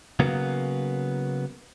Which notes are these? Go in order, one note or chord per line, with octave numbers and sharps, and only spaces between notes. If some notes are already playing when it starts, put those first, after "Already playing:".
C#3 F#3 A#3 B3